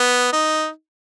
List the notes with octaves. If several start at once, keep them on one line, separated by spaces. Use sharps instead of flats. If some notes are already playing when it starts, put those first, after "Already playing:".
Already playing: B3
D#4